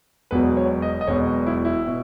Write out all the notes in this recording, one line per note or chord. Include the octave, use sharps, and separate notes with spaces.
E1 E2 B2 F#3 B4
C#5
D#5
D#5
E1 E2 B2 F#3 C#5
E4
E4
B2